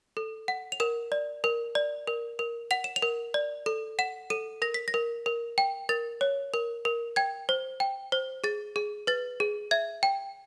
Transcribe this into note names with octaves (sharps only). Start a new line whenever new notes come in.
A4
F#5
F7
A#4 E7
D5
A#4
D5
A#4
A#4
F#5 F7
E7
F7
A#4
D5
A4
F#5 E7
A4 D#7
A#4 A#6
B6
A#6
A#4
A#4
G5
A#4 A6
C#5
A#4
A#4
G5 G#6
C5
G5
C5
G#4 A6
G#4
B4 A6
G#4
E5 G#6
G5